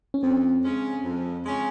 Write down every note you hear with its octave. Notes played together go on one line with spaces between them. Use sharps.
C#4
F2 C4
C#3 G#3 C#4
F2
C#3 G#3 C#4